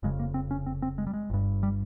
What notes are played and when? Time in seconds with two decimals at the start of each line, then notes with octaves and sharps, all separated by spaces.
0.03 F1 F2 C#3 G#3
0.19 A#3
0.34 C4
0.51 C#4
0.66 C4
0.82 C4
0.98 G#3
1.07 G3
1.14 G#3
1.30 G1 G2
1.63 G3